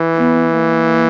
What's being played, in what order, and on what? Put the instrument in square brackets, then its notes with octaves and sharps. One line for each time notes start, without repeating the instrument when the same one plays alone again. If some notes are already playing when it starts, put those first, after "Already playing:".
Already playing: [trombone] E3
[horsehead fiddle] B3
A#3